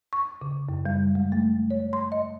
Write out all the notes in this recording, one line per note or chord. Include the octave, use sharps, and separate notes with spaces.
C#6
C#3
F#2
G3
G#3
A3
C#5
C6
D#5